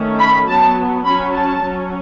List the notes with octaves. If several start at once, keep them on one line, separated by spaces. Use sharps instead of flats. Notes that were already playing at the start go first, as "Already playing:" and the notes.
Already playing: D#3 A3 C#4
B5
F#3 B3 A5
F#3 C#4 B5
A5
F#3 C#4